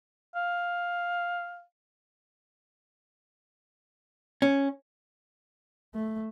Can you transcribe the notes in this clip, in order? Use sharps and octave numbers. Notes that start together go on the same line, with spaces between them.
F5
C#4
A3